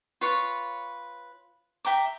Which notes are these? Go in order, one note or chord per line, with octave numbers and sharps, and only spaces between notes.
F4 B4 C#5
E5 G5 A#5 D6